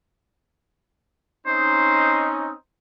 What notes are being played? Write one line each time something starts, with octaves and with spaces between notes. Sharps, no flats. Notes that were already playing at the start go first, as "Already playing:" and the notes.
C4 C#4 D#4 C5